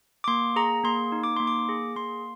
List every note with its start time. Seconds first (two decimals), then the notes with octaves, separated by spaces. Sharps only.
0.24 D6
0.28 A#3 C6
0.56 G#4 A#5
0.84 A#3 C6
1.12 D#4
1.23 D6
1.36 A#3 C6
1.47 D6
1.69 G#4
1.96 A#3 C6